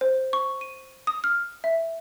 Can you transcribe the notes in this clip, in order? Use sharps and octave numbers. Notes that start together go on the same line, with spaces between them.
C5
C#6
D#7
D#6
F6
E5